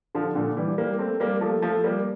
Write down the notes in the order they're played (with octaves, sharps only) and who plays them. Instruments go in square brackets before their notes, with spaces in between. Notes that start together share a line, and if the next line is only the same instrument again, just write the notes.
[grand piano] D3 F3
A#2 D3
E3 G3
G3 A#3
A3 C4
G3 A#3
F3 A3
F3 A3
G3 A#3